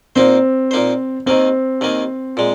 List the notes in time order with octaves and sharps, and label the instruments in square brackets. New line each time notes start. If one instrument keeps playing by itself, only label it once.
[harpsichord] A#2 A#3 D#4 C5 [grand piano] C4
[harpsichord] A#2 A#3 D#4 C5
[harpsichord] D#2 D#3 A#3 [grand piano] C4
[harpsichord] D#2 D#3 A#3
A#2 G#3